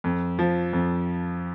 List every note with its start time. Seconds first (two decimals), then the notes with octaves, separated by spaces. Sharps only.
0.04 F2
0.39 F3
0.73 F2